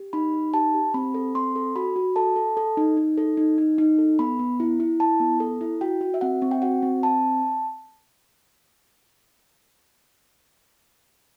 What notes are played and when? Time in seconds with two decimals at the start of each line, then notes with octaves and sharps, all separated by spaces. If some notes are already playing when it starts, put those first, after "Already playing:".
Already playing: G4
0.13 D#4 B5
0.33 D#4
0.53 G4 A5
0.74 G4
0.94 C4 B5
1.14 A4
1.35 C4 C6
1.56 A4
1.76 F#4 B5
1.96 F#4
2.16 A4 A5
2.36 A4
2.57 A4
2.77 D#4
2.97 D#4
3.18 A4
3.37 D#4
3.58 D#4
3.78 D#4
3.98 A4
4.19 B3 B5
4.39 B3
4.60 E4
4.80 E4
5.00 E4 A5
5.20 B3
5.40 A4
5.61 E4
5.81 F#4 G5
6.01 F#4
6.14 E5
6.21 C4 F#5
6.42 C4
6.51 G5
6.62 F#4 F#5
6.82 C4
7.03 C4 A5